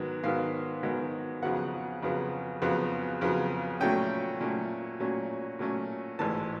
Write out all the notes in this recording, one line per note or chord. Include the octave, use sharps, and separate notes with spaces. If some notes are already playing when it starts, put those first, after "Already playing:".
Already playing: G#2 D#3 F#3 B3
G#2 D#3 F#3 B3 F5
G#2 D#3 F#3 B3
F2 C#3 F#3 B3 F#5
F2 C#3 F#3 B3
F2 C#3 F#3 B3
F2 C#3 F#3 B3
A#2 F#3 A3 C#4 G5
A#2 F#3 A3 C#4
A#2 F#3 A3 C#4
A#2 F#3 A3 C#4
A1 G#2 E3 A5